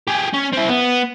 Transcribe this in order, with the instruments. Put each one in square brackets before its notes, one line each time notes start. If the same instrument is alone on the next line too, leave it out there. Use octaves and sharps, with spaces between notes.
[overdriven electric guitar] G4 G#4
C#4
C4 E4
B3